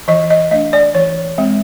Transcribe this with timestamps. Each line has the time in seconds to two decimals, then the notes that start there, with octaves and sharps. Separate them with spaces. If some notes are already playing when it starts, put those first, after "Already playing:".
0.08 E3 D#5
0.30 D#5
0.51 A3 D4 D#5
0.73 D5
0.95 E3 C#5
1.38 G#3 C4